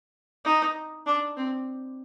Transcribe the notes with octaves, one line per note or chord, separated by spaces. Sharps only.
D#4
D4
C4